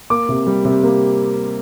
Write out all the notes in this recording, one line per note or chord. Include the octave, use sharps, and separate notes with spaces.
A#3 D6
C3
G3
C3
A#3